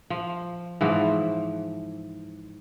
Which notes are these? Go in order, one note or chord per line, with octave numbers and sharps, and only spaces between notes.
F3
G#2 E3 F3